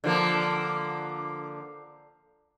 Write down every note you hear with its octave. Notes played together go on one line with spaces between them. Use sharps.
D3 F3 A#3